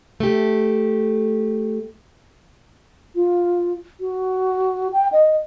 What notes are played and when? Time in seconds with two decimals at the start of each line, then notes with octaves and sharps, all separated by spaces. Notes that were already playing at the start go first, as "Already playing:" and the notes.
0.20 A3 G4
3.15 F4
4.01 F#4
4.93 G5
5.12 D#5